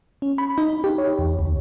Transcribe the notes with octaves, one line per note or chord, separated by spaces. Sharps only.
C#4
B5
D#4
G4
C#5
E2
D2